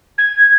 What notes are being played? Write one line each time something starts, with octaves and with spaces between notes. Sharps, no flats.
G#6